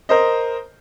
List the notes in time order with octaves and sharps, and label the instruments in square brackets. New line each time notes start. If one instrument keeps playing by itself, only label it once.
[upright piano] A#4 C5 D#5